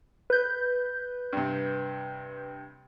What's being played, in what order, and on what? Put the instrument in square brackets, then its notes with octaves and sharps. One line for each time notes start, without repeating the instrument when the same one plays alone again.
[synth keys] B4 G6
[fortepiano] G2 C3